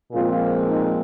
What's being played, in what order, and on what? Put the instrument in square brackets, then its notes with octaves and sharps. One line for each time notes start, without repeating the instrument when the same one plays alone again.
[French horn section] A#2 F3 G#3 C4 F4
D#4